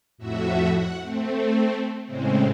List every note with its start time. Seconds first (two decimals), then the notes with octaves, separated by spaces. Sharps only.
0.18 F2 A2 F#4 E5
0.68 F#5
1.00 A3 C4
2.05 A2 C#3 G#3 C4